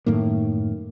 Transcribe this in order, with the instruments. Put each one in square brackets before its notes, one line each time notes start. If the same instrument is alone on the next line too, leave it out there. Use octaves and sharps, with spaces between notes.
[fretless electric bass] F#2 A2 D#3 A#3